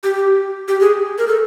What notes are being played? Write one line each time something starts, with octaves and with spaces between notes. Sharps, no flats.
G4
G4
G#4
A#4
A4